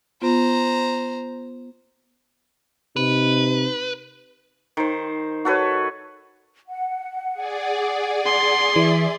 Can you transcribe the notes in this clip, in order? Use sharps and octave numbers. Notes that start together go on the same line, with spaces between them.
B3 F4 C5 A#5
C3 D#4 B4
D#3 C5
F#4 A4 B4 C#5
F#5
G#4 D5
C6
E3 E5